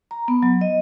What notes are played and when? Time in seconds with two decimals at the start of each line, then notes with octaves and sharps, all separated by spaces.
0.11 A#5
0.28 B3
0.43 F#3
0.61 D#5